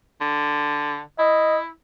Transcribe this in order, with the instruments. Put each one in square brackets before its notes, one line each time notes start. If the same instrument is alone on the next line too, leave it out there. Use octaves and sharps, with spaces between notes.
[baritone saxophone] D3
[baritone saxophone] E4 [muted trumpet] D#5